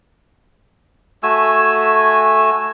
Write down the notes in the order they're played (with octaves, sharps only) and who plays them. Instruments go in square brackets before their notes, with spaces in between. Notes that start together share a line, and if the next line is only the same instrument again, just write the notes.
[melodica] A3 F#4 G#5 E6